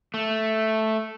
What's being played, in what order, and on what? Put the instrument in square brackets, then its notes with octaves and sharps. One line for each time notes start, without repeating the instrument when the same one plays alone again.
[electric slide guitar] A3